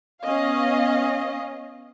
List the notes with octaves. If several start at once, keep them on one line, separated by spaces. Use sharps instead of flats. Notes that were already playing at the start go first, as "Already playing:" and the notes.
B3 C#4 D#5 F5